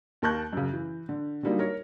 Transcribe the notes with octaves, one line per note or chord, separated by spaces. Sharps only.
D#2 A#4 A5 C#6 F#6 G6
F#2 C#3
E3
D3
D3 F#3 G3 A#3 D#4
A#4 C#5